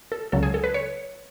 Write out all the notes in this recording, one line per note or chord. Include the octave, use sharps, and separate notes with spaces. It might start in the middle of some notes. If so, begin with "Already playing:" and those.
A4
C#2 C#3 F#3 A4
G#4
A4
B4
C#5